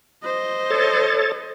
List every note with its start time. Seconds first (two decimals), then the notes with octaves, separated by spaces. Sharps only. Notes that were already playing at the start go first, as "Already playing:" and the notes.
0.24 C5 D#5
0.70 A4 C#5 A6